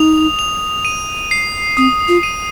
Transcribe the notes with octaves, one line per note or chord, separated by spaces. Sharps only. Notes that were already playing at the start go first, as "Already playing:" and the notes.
Already playing: D#4 D#6 F7
F7
D#7
C7
C4 D#6
F4
D#7